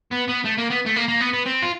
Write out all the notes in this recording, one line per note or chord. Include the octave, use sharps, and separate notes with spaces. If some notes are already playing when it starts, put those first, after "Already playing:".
B3
B3
A3
A#3
B3
A3
A#3
A#3
B3
B3
C4
F4